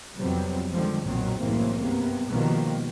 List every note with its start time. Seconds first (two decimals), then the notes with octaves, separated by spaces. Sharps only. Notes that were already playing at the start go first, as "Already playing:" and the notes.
0.19 F2 C3 F#3 G3 B3 C4
0.72 D3 D#3 F3 G3 G#3
1.03 B1 F#2 A#2 D#3 F#3 C4
1.38 F#1 C2 A2 E3 A#3 C4
1.79 G2 C3 A#3 B3
2.29 B2 D#3 F3 G3 A#3